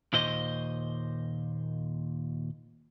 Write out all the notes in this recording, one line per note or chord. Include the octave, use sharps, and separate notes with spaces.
D#2 A#2 C5 D#5